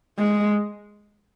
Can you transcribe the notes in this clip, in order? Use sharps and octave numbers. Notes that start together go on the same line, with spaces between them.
G#3